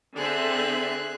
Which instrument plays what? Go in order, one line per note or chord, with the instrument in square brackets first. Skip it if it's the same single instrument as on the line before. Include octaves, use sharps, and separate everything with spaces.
[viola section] D3 C4 E5 [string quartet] G#4 F#6